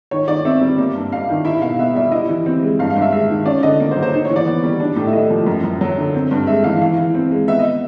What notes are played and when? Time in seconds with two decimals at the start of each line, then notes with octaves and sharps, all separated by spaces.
0.11 D#3 C#5
0.28 D#3 D5
0.45 C4 E5
0.61 G3
0.78 A#3
0.95 G2
1.12 G3 F5
1.29 D#3
1.45 E4 E5
1.61 B2 F5
1.79 B3 E5
1.95 G3 E5
2.12 E4 D#5
2.29 E3
2.46 C4
2.62 G#3
2.79 G2 F5
2.90 F5
2.96 G2 E5
3.12 G#3 E5
3.30 D#3
3.45 C#4 D5
3.63 D3 D#5
3.80 A#3
3.91 C5
3.97 F#3
4.02 C5
4.13 D#4
4.25 E3 C#5
4.36 D5
4.46 B3
4.63 G3
4.80 D4
4.96 A2
5.07 E5
5.13 A3 D#5
5.30 F3
5.46 F#2
5.64 F#2
5.81 F#3
5.97 D3
6.14 C4
6.31 G2
6.47 G#3 E5
6.64 E3 F5
6.81 E3 F5
6.98 E3
7.14 C4
7.31 G#3
7.48 B3 E5
7.59 D#5